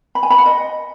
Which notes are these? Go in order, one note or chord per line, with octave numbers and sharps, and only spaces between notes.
B5
G#5
B5
F#5
D#5